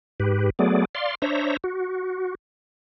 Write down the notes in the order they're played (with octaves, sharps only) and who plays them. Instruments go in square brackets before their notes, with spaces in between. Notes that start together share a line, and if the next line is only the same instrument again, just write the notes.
[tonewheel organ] G#2 G4 B4
F#3 A3 B3 G#4 D5
D5 F5 C6
D4 C5 C#5 E5 A#5
F#4